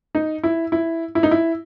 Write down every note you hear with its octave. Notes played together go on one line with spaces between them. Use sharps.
D#4
E4
E4
E4
D#4
E4